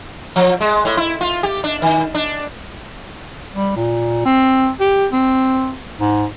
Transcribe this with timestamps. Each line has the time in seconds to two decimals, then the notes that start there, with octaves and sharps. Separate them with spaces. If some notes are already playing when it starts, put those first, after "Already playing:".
0.36 F3
0.61 G#3
0.85 A2
0.97 E4
1.21 F4
1.43 G4
1.64 D4
1.82 D#3
2.15 D4
3.54 G3
3.76 A#2
4.25 C4
4.81 G4
5.13 C4
6.01 G#2